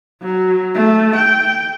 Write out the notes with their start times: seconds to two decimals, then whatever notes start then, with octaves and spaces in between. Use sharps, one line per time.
0.23 F#3
0.75 A3
1.16 G5